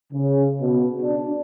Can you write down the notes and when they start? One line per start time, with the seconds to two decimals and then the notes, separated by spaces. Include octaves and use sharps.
0.12 C#3
0.60 B2
1.01 D4